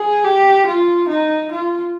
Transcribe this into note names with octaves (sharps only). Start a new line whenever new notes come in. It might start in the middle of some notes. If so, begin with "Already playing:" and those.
Already playing: G#4
G4
F4
D#4
F4